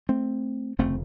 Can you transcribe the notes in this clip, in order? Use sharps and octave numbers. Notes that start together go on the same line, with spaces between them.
A3 C4
F1 D#2 C#3 A3 C4